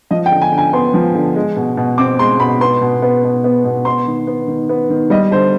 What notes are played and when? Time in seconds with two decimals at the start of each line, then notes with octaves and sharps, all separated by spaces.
0.11 F3 D#5
0.26 G5
0.31 D3
0.42 G#5
0.52 D3
0.58 G#5
0.73 B3 C6
0.94 F3
1.15 D3
1.35 G#3
1.56 B2
1.77 B2
1.98 C4 D6
2.19 G#3 C6
2.40 B2 B5
2.61 B3 C6
2.81 B2
3.02 B3
3.24 B2
3.44 B3
3.64 B2
3.85 B3 C6
4.07 D#3
4.27 B3
4.48 D#3
4.69 B3
4.90 D#3
5.10 G3 D#5
5.31 D3 C5